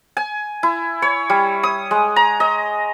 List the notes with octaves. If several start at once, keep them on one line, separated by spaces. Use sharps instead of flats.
G#5
E4
C#5
G3
D#6
G#3
A#5
D#5